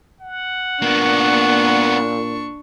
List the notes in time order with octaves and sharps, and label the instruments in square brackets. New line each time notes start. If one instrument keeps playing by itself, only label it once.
[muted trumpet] F#5
[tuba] A#2 [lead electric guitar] A#3 B3 [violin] D4 C#6